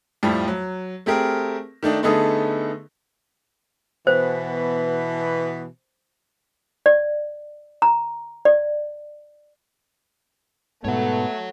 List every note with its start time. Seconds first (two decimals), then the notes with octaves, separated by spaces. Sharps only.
0.23 F2 A2 F3 G3
0.48 F#3
1.06 A3 C4 G4 G#4 A#4
1.83 D#3 A3 D4 D#4
2.03 D3 A3 B3 D#4 G#4 A4
4.07 B2 E3 B3 C5
6.86 D5
7.82 A#5
8.45 D5
10.85 G#2 B2 A3 B3 C#5 F#5